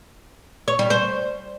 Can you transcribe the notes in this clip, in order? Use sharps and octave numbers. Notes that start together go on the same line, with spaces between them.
C#5
G3
C5